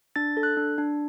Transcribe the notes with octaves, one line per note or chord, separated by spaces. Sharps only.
D4 A6
A4
F#6
D4
D4